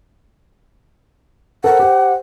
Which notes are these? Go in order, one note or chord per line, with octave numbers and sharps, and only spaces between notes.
A4 A#4 C5 F#5
G4 C5